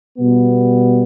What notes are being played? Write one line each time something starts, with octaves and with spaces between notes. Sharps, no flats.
B2 G3 B3